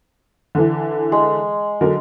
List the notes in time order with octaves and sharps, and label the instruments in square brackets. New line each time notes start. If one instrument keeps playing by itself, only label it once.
[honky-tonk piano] D3 E3
[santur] G#3
[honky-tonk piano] D3 F#3 A#4